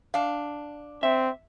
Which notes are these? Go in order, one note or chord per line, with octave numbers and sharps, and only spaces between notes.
D4 F5
C4 E5